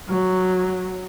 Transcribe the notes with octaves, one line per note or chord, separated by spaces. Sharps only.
F#3